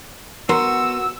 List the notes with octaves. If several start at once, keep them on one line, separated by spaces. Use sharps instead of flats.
B3 F#4 A#4 C6 E6